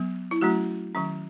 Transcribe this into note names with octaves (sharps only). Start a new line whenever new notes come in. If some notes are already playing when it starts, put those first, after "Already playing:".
Already playing: F#3 B3
E4
F#3 A3 C#4 F#4
D#3 F#3 C#4